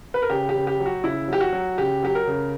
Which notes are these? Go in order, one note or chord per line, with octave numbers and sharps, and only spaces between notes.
B4
A#4
C#3 G4
G4
C#3
G4
F#3
F#4
C#3 E4
F#3 G4
F#4
F#3
C#3 G4
F#3 G4
A#4
C#3